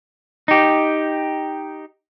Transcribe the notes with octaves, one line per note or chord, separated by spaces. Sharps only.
D#4 G4